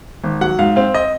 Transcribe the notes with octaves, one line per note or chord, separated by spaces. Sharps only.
G#1
F#3 F#5
G#2 F5
C4 F5
D#5